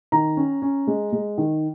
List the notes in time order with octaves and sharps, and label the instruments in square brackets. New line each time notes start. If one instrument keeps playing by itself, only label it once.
[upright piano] D#3 A#5
C#4
C#4
G#3
G#3
D#3